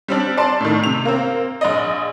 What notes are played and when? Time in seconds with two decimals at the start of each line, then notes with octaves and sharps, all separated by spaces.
0.08 G3 C4 D4
0.37 D5 A5 C6
0.60 A2 D#3
0.84 C3 F7
1.05 A#3 C4
1.61 A#1 D5 D#5